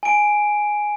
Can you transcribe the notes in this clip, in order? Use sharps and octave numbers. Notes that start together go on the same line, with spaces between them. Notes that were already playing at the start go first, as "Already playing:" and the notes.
G#5 D7